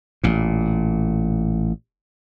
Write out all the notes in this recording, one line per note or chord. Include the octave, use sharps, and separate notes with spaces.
A1 A#2